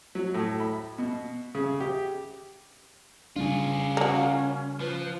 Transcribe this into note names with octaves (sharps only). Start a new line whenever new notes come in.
F#3
A2
B5
B2
C#3
G4
C#3 G3 D4 F4 G#4
A#3 C#4 F#4
F3 B4